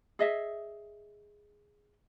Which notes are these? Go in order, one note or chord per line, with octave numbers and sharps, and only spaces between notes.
G#4 D#5 E5